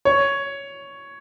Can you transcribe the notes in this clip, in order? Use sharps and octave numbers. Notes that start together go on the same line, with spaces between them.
C#5